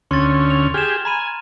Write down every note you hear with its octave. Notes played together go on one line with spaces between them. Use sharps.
D2 C#4 C6 A6
F7
G4 G#4 F6 E7
G#5 A#5 B5 D#7